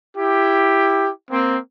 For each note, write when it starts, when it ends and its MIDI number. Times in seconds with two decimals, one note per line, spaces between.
0.16 1.10 64
0.16 1.10 67
1.31 1.58 58
1.31 1.58 60